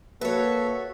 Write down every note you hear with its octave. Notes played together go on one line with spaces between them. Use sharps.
A#3 F#4 A4 B4 C#5 E5